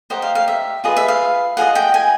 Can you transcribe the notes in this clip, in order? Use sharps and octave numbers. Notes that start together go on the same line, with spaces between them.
D#4 G4 C5 D#5 F#5
F5
F5
E5
F4 G#4 B4 D#5
E5
F5
F4 G#4 C5 D#5 F#5
G5
G#5